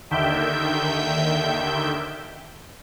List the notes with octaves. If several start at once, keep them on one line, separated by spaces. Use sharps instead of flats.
D#2 D3 D#3 E5 G5 G6